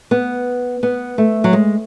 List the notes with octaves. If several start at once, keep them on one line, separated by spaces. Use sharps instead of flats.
B3
B3
A3
F#3
G#3